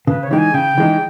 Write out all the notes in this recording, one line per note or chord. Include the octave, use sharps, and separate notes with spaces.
C#3 B4
C#5
E3 G#3 D#4 G5
G#5
C#3 G5
E3 G#3 D#4